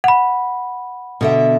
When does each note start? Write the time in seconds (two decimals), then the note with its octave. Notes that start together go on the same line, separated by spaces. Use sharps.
0.04 F#5 B5
1.21 B2 D3 E5